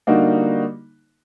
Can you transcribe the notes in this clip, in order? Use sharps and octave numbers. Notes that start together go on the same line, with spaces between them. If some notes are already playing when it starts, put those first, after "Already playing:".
D3 G3 A#3 D#4 F#4